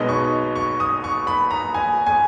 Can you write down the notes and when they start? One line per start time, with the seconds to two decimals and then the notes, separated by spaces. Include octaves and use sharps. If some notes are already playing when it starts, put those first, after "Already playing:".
Already playing: B1 B2 G#3 B3 D#4 D#5
0.09 C#6
0.56 C#6
0.80 D#6
1.04 C#6
1.27 B5
1.51 A#5
1.74 G#5
2.06 G#5